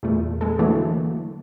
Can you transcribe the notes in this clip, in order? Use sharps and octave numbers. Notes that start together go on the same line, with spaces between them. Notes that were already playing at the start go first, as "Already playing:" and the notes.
E2 A#2 A3
G#3 A4
D3 E3 F#3 A3 A#3